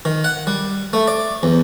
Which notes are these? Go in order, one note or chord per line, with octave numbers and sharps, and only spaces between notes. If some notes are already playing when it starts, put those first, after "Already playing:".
D#3
F#5
G3
A3
D5
E2